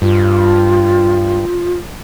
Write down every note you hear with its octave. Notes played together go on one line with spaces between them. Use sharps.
G2 F4